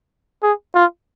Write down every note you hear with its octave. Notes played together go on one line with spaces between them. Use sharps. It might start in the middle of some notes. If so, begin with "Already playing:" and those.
G#4
F4